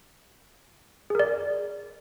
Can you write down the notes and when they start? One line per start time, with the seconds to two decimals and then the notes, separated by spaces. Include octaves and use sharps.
1.10 G#4
1.15 A#4
1.19 D5